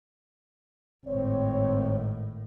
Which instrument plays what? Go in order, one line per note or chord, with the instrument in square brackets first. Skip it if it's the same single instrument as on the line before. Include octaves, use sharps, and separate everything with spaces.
[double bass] G#1 A2 [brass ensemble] C4 C#5